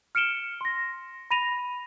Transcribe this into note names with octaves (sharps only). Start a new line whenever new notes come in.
F6 C#7 D7 E7 G7
C6 A#6
B5 A#6 D#7 F7